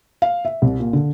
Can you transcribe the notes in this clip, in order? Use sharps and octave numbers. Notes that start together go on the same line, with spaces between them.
F5
E5
C2
A#2
D3